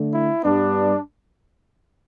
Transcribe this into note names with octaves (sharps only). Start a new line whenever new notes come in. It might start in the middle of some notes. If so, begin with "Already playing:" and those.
Already playing: D3 A3
E4
G2 G3 B3 D4